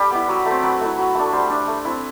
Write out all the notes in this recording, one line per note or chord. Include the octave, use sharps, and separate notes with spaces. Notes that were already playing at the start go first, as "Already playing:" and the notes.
Already playing: G3 D4 G4 A4
B3 E4
F#3
A3 C4
F#3 B4
A3 E4
F#3
A3 D4
G3 C5
D4
A3
C4 E4